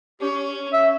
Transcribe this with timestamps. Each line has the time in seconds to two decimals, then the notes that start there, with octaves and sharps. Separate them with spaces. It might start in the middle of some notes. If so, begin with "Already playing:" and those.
0.20 C#4 G4
0.73 E5